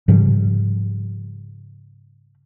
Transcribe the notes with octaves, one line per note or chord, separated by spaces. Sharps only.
G#2 C#3 F3 G3